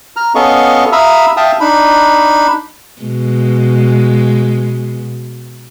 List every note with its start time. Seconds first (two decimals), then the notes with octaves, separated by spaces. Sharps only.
0.16 A#5 F6
0.35 B3 C#4 A4 D#5 F5 C#6
0.92 E5 F5 A#5 B5 D#6 E6
1.37 E5 F5 G5 A5 D#6
1.61 D4 D#4 B5
3.02 B2 G#3